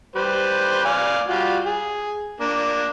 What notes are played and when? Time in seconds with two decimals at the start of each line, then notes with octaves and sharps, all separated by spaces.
0.15 G3 B4 C5
0.85 D5 F5 G#5
1.28 G3 F4 F#4
1.65 G#4
2.40 A#3 D4